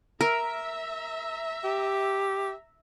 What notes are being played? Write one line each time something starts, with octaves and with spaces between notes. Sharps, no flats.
A#4 E5 A#5
G4